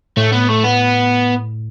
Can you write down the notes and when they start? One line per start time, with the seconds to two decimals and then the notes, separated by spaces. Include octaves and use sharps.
0.17 A2 A3
0.33 B3
0.49 A3
0.64 B3